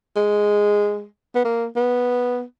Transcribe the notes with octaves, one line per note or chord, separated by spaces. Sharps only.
G#3
B3
A#3
B3